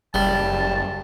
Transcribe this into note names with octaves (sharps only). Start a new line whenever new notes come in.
F#1 G3 A5